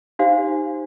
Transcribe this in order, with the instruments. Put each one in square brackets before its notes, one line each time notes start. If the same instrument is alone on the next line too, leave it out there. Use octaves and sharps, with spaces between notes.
[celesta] D#4 G4 C5 F5